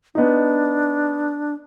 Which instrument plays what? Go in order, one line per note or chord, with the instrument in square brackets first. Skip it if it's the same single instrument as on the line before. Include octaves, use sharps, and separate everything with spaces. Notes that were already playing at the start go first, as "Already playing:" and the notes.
[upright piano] B3 D#4 [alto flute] D4